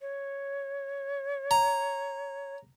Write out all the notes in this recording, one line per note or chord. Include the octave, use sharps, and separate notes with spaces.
C#5
A#5